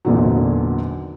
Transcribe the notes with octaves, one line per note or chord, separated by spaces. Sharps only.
G#1 E2 A#2 D3 D#3 F#3